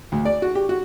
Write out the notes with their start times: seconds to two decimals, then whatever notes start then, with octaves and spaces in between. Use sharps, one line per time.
0.12 D2
0.25 D5
0.42 F#4
0.55 G4
0.69 F#4